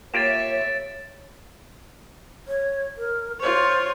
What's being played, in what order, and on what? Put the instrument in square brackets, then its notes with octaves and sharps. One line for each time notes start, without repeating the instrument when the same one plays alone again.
[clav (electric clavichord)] A#3 F4 G4 [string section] C#5 E5 [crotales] A6 D7 E7
[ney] C#5
A#4
[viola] F4 C#5 [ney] C5